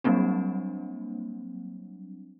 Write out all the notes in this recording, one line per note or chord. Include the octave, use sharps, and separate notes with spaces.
F#3 G3 A#3 C4 D4